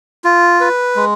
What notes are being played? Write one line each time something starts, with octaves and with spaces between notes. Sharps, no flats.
F4
B4
G#3